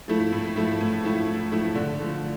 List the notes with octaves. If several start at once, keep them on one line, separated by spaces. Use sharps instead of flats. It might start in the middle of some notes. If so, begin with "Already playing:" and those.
F3 A3 E4
A2
F3 A3 E4
A2
F3 A3 E4
A2
F3 A3 E4
D3
F3 A3